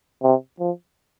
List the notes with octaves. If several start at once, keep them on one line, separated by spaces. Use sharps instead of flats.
C3
F3